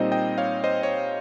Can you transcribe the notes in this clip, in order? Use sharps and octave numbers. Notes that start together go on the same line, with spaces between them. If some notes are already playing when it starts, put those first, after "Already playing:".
Already playing: A#2 G3 C4 D#4 C5 D#5
D#5 G5
C#5 F5
C5 D#5
C#5